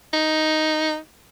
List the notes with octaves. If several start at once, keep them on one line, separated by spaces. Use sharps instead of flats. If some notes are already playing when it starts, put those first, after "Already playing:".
D#4